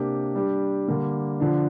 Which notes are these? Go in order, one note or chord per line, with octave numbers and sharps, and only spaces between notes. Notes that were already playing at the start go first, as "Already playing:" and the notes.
Already playing: C3 A#3 D4 G4
G3 D4 G4
D3 G3 A#3
D3 F3 D4